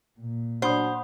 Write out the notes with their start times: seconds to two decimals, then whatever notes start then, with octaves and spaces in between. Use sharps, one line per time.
0.19 A#2
0.62 F#3 C#4 D4 C5 F#5 B5 D#6